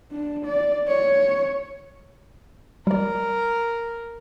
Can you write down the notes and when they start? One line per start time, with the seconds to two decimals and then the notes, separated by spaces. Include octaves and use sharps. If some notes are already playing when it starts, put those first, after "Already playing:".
0.11 D4
0.45 D5
0.88 C#5
2.87 G3 A#4 D5